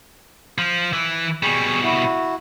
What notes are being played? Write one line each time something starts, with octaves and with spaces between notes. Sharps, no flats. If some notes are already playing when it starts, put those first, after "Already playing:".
F3
E3
B2 G3 G#4 C#6
E4 F#4